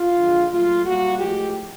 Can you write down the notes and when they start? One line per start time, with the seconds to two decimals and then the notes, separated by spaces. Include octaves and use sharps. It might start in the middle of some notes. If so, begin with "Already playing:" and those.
Already playing: F4
0.17 D3 F3 G#3
0.51 A#2 F#3 A3 F4
0.85 A#2 G3 A#3 F#4
1.19 A2 F3 G#3 G4